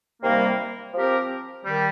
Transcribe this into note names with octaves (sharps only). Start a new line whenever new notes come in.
C3 D#3 G3 A#3
F3 C4 G4 A#4
D#3 G3